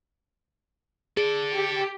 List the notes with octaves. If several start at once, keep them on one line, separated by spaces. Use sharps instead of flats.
G#4 A4 D5
G4